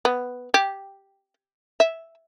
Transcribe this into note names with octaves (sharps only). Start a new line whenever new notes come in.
B3
G4
E5